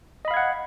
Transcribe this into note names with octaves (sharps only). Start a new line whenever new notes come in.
D#5 F5 F#5 B5 G#6